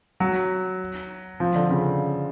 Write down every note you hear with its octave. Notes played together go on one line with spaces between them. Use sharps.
F#3
F3
D3
C#3